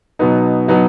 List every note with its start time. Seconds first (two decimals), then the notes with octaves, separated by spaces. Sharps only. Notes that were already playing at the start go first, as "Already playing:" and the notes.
0.19 B2 F#3 B3 D#4
0.68 B2 F#3 B3 D#4